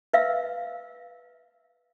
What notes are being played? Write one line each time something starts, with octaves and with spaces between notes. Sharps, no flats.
B4 E5 F5 E6